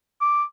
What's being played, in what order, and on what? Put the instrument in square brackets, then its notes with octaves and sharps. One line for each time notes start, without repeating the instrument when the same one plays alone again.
[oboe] D6